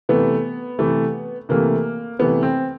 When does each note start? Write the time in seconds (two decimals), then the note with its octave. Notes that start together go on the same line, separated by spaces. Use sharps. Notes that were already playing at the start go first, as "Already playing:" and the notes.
0.09 C3 E3 A3 B3
0.79 C3 E3 A3
1.49 C3 E3 A3 A#3
2.19 C3 E3 A3 B3
2.43 C4